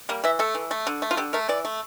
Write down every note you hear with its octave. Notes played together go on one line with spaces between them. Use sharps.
G3 A#3
E3 E5
A3 A4
E3
A3
D3
A3
F4
D3 G4
A3 A#4
E3 D5
A3